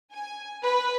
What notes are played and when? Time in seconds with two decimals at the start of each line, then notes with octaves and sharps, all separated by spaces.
0.12 G#5
0.64 B4